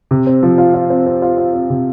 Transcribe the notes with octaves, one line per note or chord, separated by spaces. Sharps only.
C3
C4
F3
F4
F4
C4
C4
F4
F4
C4
C3